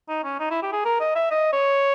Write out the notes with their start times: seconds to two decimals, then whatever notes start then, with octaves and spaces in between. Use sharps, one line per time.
0.09 D#4
0.24 C#4
0.40 D#4
0.51 E4
0.62 G4
0.73 G#4
0.85 A#4
1.00 D#5
1.15 E5
1.31 D#5
1.53 C#5